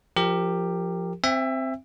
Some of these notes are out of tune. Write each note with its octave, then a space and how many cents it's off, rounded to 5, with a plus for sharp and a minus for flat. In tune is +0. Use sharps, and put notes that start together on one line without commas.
F3 +0 G4 +10 A#4 -15
C4 +0 E5 +15 G5 +45